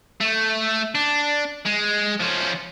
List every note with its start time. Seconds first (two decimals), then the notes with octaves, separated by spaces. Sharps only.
0.21 A3
0.95 D4
1.65 G#3
2.20 F3 C#4